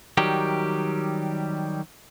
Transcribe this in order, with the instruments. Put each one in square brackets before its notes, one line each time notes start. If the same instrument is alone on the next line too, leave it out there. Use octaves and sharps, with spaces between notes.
[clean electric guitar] D#3 F#3 G3 G4